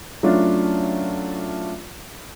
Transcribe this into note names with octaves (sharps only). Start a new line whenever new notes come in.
F#3 A3 C#4 D4 F4